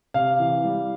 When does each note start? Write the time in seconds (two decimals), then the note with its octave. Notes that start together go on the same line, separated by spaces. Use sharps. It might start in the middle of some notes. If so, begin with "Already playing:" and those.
0.14 C3 F5
0.39 E3
0.64 G3